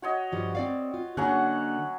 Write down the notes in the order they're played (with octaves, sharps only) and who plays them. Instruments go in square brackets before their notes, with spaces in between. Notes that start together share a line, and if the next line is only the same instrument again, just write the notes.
[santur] F#4 C#5 D#5
[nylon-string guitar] G2 F3 G3
C4 D5 F5
F4
[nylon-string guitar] D3 A#3 G#4 [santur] F#3 C#4 F#5